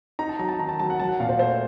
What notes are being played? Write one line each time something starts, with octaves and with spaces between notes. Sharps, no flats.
D#4 A#5
A5
F#3 A#5
A5
D#3 A#5
A5
F#3 A5
F#5
F#3 A5
F#5
A#2 F5
C5
A3 C5